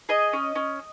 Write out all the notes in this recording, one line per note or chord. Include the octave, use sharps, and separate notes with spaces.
G#4 D#5
C#4
C#4